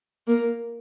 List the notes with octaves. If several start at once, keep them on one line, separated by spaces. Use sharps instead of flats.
A#3